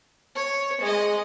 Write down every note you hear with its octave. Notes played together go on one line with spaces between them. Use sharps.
C#5
G#3 D#5